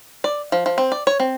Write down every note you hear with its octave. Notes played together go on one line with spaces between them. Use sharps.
D5
F3
F3
C4
D5
C#5
C4